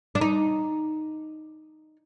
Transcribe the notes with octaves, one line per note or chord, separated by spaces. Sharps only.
D4
D#4